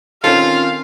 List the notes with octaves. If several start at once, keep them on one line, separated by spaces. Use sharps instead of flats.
D#3 C4 C#4 F4 A4 F5